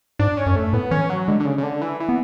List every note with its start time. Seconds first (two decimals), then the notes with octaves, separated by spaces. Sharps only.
0.19 G#2 D4
0.37 C#4
0.46 F#2
0.56 A3
0.73 A2 B3
0.91 E3 C#4
1.10 F#3
1.28 D3 G#3
1.40 D3
1.46 C#3
1.58 C#3
1.63 D3
1.82 E3
2.00 E3
2.09 B3